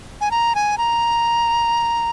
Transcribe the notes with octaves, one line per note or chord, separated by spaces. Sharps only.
G#5
A#5
G#5
A#5